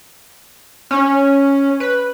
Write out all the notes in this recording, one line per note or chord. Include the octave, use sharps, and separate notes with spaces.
C#4
B4